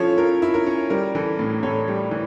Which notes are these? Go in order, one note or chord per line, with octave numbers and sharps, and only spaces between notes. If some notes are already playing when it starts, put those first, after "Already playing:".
Already playing: F3 C#4 E4 A4 C#5
F3 A#4
E4
A#4
C#4
G3 A#4
E3 A4
A2
A2 A4 C#5
G3
E3